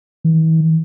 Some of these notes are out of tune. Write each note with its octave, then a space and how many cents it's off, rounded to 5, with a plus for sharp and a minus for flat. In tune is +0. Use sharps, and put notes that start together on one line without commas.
E3 -40